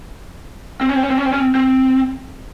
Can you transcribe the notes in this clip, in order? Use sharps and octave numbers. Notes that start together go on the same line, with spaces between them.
C4
C#4
C4
C#4
C4
C#4
C4
C#4
C4
C4